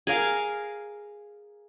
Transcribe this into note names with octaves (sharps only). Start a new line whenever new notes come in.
G#4 A#4 F5 G#5